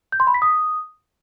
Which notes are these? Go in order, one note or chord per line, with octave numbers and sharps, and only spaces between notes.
G6
C6
B5
B6
D#6